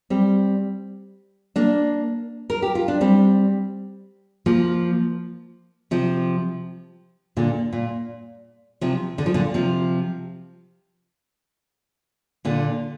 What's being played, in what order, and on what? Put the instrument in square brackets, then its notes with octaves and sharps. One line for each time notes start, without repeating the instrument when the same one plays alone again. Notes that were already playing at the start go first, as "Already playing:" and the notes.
[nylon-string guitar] G3 C4
A#3 D4
A#4
G4
F4
D4
G3 C4
F3 A#3
C3 F3
A#2 D3
A#2
C3 F3
D3
F3
A#2 D3
C3 F3
A#2 D3